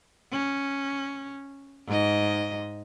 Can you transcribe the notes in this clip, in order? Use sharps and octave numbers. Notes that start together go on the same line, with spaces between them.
C#4
G#2 D#5